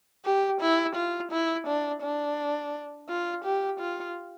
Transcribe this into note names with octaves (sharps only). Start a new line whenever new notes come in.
G4
E4
F4
E4
D4
D4
F4
G4
F4